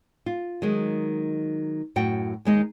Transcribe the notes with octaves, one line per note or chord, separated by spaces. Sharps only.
F4
D#3 F#3 G#3
F#2 A2 F#4 G5
D#2 G#3 D#4 D#5